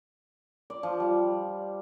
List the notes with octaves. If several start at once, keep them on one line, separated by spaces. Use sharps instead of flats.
D5
F3
G3